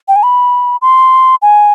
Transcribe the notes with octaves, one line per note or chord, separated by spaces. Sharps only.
G5
G#5
B5
C6
G#5